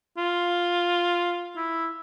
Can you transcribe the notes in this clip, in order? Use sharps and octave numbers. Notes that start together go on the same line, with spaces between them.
F4
E4